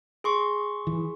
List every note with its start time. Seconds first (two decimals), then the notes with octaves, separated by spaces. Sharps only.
0.24 G#4 C6 C#6
0.87 E3